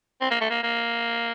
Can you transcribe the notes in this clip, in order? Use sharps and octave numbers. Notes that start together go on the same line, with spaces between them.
C4
A#3
A3
A#3
A#3